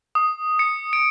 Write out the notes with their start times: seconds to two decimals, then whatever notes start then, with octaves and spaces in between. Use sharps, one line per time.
0.15 D#6
0.59 C#7
0.93 D7